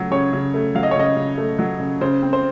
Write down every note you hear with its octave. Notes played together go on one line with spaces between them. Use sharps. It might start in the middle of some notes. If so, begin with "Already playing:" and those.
Already playing: C#3 F#3 A3
C#3 C#5
C#3
A3
F#3 F5
D#5
C#5
C#3 D#5
C#3
A3
F#3
C#3
C#3 C5
C4
C5